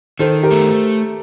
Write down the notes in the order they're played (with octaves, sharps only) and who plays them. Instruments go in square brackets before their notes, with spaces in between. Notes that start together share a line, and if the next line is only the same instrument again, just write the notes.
[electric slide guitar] D#3 [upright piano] A4 C5
[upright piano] G4 A#4
[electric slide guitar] A3